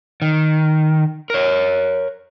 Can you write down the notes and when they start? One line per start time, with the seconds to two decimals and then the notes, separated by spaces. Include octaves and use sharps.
0.22 D#3
1.30 A#4 C#5